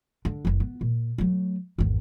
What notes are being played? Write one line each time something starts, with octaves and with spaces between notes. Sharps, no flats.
D3
F#1 E3
B3
A#2
F#3 A3
G#1 E2